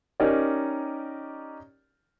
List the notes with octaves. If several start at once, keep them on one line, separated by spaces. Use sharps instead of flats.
C#4 D#4 G4 A#4 D5 D#5